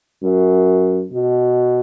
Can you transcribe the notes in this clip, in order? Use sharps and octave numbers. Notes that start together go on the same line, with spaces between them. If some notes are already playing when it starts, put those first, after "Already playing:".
F#2
B2